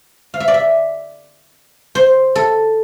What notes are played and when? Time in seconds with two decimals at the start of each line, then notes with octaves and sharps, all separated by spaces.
0.34 F5
0.40 E5
0.48 D5
0.54 E5
1.95 C5
2.35 A4